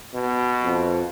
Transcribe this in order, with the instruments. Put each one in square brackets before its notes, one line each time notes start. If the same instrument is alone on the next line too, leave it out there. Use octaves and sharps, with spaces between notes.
[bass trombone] B2
[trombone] F2